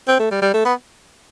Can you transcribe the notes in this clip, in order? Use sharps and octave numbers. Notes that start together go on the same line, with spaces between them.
C4
A3
G3
G3
A3
B3